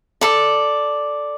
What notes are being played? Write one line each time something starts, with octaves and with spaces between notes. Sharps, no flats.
A4 D5